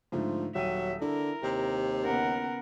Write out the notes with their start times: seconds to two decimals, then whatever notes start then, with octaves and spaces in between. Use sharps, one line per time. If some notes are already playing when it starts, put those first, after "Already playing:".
0.12 G#2 D3 F3 A3
0.55 D#1 F#3 E5 G5 D#7
1.01 D3 E4 A#4
1.43 D#2 C3
2.05 C#3 B3 A#4 F#5